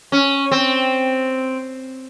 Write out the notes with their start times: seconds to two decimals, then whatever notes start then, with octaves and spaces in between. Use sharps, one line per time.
0.12 C#4
0.51 C4